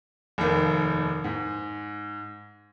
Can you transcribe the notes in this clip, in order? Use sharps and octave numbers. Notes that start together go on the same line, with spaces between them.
F1 D#2 D#3
G#2